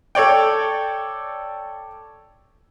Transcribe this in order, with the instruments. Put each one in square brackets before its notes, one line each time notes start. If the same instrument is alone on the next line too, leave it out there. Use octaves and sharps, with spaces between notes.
[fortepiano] A4 C#5 D5 G5